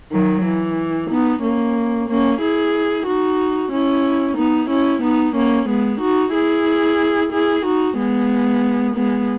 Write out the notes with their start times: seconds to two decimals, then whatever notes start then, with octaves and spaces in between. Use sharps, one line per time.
0.12 D#3 F#3
0.45 E3
1.10 B3 D#4
1.43 A#3 C#4
2.08 A#3 C#4
2.41 E4 G#4
3.06 D#4 F#4
3.72 C#4 E4
4.37 B3 D#4
4.70 C#4 E4
5.03 B3 D#4
5.35 A#3 C#4
5.69 G#3 B3
6.01 D#4 F#4
6.34 E4 G#4
7.32 E4 G#4
7.65 D#4 F#4
7.98 G#3 B3
8.96 G#3 B3